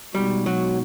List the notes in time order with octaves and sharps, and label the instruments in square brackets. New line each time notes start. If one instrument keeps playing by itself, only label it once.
[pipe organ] B2 G#3 B3 D#4 F#4 [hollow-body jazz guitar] G3
[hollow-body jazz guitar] F#3